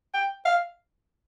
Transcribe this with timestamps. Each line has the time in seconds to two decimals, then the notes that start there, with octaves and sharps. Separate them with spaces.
0.14 G5
0.45 F5